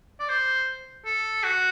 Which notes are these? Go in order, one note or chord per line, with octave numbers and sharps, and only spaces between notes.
D5
C5
A4
F#4